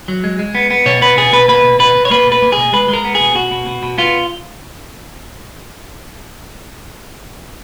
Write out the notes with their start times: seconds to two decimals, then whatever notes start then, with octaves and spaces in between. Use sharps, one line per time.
0.08 F#3
0.24 G#3
0.39 G#3
0.55 B3
0.70 B3
0.86 B2 C#5
1.02 B3 B4
1.17 B2 G#4
1.33 B2 B4
1.48 A#3 B4
1.64 B2
1.79 B2 B4
1.95 B2
2.05 C#5
2.10 A#3 B4
2.26 B2
2.32 B4
2.42 A#3
2.52 G#4
2.58 B2
2.73 G#3 B4
2.88 G#3 A#4
3.05 B3
3.15 B2 G#4
3.35 B2 F#4
3.51 B2
3.66 B2
3.83 B2
3.98 B3 F4